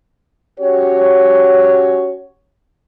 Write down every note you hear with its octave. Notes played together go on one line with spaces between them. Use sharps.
C#4 F#4 G4 C#5